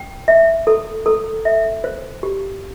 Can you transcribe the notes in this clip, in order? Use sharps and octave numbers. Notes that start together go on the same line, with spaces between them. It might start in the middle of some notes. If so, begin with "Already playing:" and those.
Already playing: G5
E5
A4
A4
E5
C5
G4